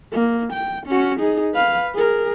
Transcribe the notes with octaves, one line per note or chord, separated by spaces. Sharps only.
A#3
G5
C#4 F#4
D#4 G#4
B4 F5
G#4 A#4